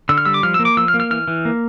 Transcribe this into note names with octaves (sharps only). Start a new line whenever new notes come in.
D3 E6
F6
G3 E6
D6
F3 F6
E6
A#3
D6
F3 E6
F6
A#3
F6
E3 F6
E3
A#3